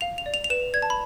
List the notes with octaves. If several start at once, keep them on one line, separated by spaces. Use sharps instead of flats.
F5 F7
F7
D5
F7
F7
B4 E7
D5 G#6
A5
B5